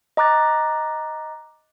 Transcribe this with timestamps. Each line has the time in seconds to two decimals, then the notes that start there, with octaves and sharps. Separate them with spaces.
0.17 D#5 A#5 D6 F#6 A6